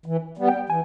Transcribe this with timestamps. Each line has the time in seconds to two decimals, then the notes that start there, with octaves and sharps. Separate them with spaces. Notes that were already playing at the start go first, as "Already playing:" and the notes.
0.06 E3
0.37 G3 B3
0.48 G5
0.69 E3 G#5